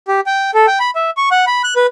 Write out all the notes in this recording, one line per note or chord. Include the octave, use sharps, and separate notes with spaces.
G4
G5
A4
G5
B5
E5
C#6
F#5
B5
F#6
B4